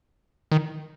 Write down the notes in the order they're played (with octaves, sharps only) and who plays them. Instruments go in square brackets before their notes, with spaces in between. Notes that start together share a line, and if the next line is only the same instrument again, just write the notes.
[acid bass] D#3